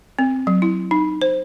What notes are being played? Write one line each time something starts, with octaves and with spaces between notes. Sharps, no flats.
C4
F#3
E4
D#4
C5